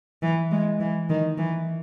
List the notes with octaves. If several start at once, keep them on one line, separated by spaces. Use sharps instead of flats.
E3
G#3
E3
D#3
E3